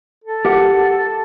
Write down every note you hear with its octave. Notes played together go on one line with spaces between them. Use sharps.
A4
G4 A#4 F#5